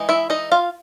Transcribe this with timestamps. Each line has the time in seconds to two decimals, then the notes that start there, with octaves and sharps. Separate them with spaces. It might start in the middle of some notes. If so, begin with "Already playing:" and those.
Already playing: E3 G#3 D#4
0.09 E4 E5
0.30 D#4 D#5
0.52 F4 F5